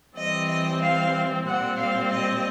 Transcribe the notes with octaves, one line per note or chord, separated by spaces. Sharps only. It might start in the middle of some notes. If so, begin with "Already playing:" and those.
E3 G3 C4 D#5
D#5
F5
A#2 G3 C4 F#5
F5
D#5